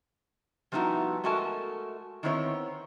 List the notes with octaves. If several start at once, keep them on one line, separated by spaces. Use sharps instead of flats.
F3 G3 B3 D#4 E4 F#4
G#3 A3 F#4 A#4 G#5 A5
D#3 B3 C4 E4 C5 C#5